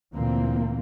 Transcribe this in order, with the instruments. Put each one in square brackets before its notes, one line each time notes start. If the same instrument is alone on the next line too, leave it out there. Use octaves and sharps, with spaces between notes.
[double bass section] D2 A#2 E3 A#3 C4